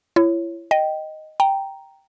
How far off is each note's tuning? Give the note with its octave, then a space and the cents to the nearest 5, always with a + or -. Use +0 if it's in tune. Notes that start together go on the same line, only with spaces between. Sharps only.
E4 +35 C#5 -5
D#5 +0 G5 -10
G5 +0 A#5 +0